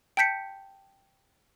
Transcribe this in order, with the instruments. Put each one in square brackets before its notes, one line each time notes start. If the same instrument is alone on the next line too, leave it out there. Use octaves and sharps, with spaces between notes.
[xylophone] G5 A5 G6 B6 C#7